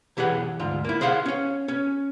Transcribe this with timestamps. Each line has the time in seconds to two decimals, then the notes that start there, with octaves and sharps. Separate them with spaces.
0.17 B1 E3 G4 G#4 F#5
0.60 D2 G#2 F4
0.85 A#3 E4
1.01 G#4 C5 D#5 F5 F#5
1.26 C#4 C#5
1.68 C#4